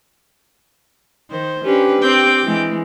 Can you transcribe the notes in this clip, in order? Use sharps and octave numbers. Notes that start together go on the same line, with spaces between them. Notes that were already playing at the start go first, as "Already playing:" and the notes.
D#3 C5
C#4 D4 G4 B4
C4 G5 D6
E3 G#3